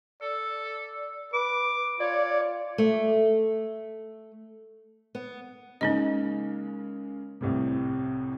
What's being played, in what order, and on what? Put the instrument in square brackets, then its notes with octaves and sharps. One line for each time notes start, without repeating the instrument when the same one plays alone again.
[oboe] A4 [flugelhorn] D5
[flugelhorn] B4 [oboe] D6
[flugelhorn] F4 [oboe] C#5 [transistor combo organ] D5
[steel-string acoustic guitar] A3
B3
[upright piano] C#3 G#3 A#3 [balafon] C#4 D#4 D#5
[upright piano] C2 A2 C3